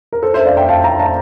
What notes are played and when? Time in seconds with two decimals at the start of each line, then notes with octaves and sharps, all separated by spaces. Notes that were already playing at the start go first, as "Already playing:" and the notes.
0.13 A#4
0.23 A4 C5
0.34 C5 E5
0.46 D5 F5
0.57 E5 G5
0.69 F5 A5
0.84 G5 A#5
0.99 F5 A5